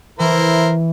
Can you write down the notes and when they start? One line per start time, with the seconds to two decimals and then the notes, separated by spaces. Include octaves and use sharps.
0.19 E3 E4 A#4 C5